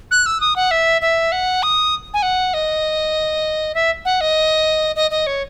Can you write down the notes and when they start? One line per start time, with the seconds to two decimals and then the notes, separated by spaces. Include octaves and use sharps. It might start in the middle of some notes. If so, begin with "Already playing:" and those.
0.11 F#6
0.26 E6
0.41 D#6
0.56 F#5
0.71 E5
1.02 E5
1.32 F#5
1.63 D#6
2.14 G#5
2.22 F#5
2.54 D#5
3.75 E5
4.05 F#5
4.21 D#5
4.96 D#5
5.11 D#5
5.27 C#5